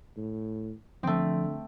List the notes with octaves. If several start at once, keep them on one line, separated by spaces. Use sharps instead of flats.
A2
D3 F3 A3 C4